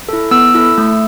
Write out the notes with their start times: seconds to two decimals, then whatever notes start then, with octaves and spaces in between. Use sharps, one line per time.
0.09 E4 A4
0.31 B3 E6
0.54 E4 A4
0.78 A3